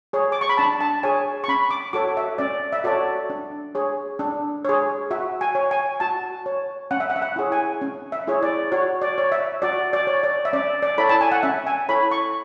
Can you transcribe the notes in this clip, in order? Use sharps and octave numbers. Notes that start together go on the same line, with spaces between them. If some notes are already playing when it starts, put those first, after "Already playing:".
G#4 C#5
D6
C#6
B5
D4 A5
A5
G#4 C#5 G#5
C#6
C#4 B5
D6
F#4 A4 C#5 D6
E5
C#4 D5
E5
F#4 A4 C#5 D5
D4
G#4 C#5
D4
G#4 C#5
F#4 E5
G#5
C#5
G#5
F#4 A5
C#5
C#4 F#5
E5
F#5
E5
F#5
E4 G#4 C#5
G#5
C#4
E5
E4 G#4 C#5
D5
F#4 C#5
D5
C#5
E5
F#4 D5
D5
C#5
D5
E5
C#4 D5
D5
E4 A4 C#5 B5
A5
G#5
F#5
C#4 E5
G#5
E4 A4 C#5 B5
C#6